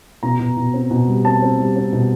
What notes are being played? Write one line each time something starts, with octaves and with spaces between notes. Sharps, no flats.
B2 A#5
B2
B2
C4
B2
G3
C4 A5
C4
G3
C4
B2